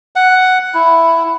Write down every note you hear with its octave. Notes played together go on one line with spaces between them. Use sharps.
F#5
E4